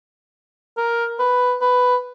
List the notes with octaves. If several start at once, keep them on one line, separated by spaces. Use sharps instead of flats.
A#4
B4
B4